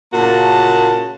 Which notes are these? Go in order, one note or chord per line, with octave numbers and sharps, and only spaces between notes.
A#2 C#3 A#3 F#4 A5